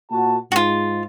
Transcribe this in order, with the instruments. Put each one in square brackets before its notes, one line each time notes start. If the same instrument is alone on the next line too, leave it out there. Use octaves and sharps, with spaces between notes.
[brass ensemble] A#2 F#4 A5
[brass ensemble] G#2 [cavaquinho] F4 F#4